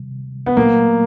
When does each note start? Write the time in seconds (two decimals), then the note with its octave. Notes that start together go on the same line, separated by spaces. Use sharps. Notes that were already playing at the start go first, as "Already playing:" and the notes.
Already playing: C3 D#3 G3
0.46 B3
0.57 A#2 F#3 A3 A#3